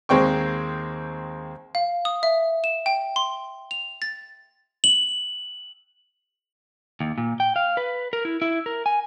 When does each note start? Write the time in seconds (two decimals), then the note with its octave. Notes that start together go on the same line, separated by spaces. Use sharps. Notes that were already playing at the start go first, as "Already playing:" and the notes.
0.09 D#2 G#3 C4 G5 C#6
1.75 F5
2.05 D#6
2.23 E5
2.64 E7
2.86 G5
3.16 C6
3.71 F7
4.02 A6
4.84 F#7
7.00 D#2
7.18 A#2
7.40 G5
7.56 F5
7.77 B4
8.13 A#4
8.25 E4
8.42 E4
8.66 A#4
8.86 G#5